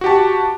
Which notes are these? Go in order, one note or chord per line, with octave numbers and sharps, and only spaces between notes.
F#4 G4 A5